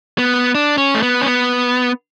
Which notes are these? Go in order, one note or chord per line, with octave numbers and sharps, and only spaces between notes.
B3
D4
C#4
A3
B3
C#4
B3